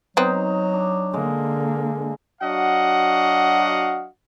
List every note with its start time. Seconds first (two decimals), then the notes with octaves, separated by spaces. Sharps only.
0.17 F#3 B3 C4 D#4
0.74 D4
1.14 D3 G#3 A#3
2.41 F#3 D4 F#4 D#5 F5 F#5